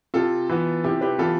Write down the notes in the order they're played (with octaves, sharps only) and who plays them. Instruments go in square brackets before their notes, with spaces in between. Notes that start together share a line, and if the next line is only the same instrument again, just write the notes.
[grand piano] C3 [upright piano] F4 A4
[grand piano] E3 B3
[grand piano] C3 [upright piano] E4 G4
[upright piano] G4 B4
[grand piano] E3 B3 [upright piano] F4 A4